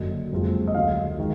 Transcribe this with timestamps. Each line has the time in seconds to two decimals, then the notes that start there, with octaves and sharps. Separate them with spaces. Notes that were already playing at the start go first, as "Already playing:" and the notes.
Already playing: F#1 F#2 D3 F#3 D#5
0.32 F#1 F2 F3 G#3
0.68 D#5
0.75 D2 D3 F#3 F5
1.18 D#3 G#3